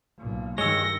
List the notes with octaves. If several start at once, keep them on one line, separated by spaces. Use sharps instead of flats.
B1 A#2
G2 D#3 G#3 C#5 E6 A#6 C#7 G7